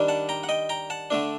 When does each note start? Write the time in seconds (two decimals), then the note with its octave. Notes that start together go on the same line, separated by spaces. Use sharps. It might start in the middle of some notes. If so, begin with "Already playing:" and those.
Already playing: D#3 G3 D4
0.08 F#5 A5
0.29 G5 A#5
0.44 F#5
0.49 D#5 G5
0.69 G5 A#5
0.90 F#5 A5
1.10 D3 A3 D4